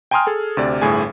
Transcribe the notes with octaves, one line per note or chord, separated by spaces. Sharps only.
G5 G#5 A#5 C6 D#6 F6
G#4 A4
D2 C3 D5
G1 A2 G#4 G#5